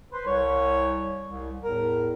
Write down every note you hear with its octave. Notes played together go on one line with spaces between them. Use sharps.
B4 C5
C2 C#5
C2
E2 A2 A#4